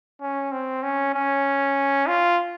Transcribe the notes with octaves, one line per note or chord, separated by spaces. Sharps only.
C#4
C4
C#4
C#4
F4